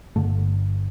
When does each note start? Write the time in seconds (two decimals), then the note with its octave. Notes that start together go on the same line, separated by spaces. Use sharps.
0.16 G1 G2 D3 A3